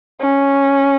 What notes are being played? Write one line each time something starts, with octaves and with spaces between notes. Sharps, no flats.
C#4